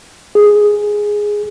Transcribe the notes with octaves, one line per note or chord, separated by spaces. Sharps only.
G#4